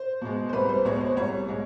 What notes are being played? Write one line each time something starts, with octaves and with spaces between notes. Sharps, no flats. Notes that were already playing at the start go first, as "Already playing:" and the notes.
Already playing: C5
B2 G#3
C5
C2 B4
C5
B2 G#3 C#5
C5
C2 C#5
B2 G#3